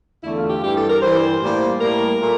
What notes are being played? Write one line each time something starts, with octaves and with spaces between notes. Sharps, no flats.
E2 D3 A3 E4
F4
G4
G2 E3 G3 G4
A4
A#4
G2 E3 G3 C5
A2 G3 A#3
A2 G3 A#3 A#4
A#2 A3